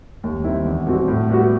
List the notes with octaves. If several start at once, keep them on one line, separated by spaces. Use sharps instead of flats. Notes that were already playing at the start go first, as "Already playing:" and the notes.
D#2
D#3 G3 C4 E4
E2
B2 G3 C4 F#4
A2
G3 B3 F#4